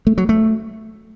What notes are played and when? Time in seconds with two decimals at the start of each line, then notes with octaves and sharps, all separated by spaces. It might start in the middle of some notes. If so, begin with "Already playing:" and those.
0.07 A3
0.18 F#3
0.29 A3